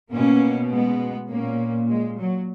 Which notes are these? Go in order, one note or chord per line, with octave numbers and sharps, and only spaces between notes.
B2 A#3 C#4
G#3 B3
A#2 A#3 C#4
G#3
F#3